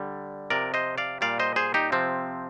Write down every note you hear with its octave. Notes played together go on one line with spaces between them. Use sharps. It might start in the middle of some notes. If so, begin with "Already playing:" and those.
Already playing: D3 G3
C3 F3 A#4 D5
C5 D#5
D5 F5
A#2 G3 D5 F5
C5 D#5
G#4 C5
D#4 G4
C3 F3 C4